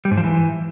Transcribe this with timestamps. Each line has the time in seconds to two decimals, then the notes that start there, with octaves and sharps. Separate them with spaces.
0.05 G3
0.11 G#2
0.17 F3
0.24 E3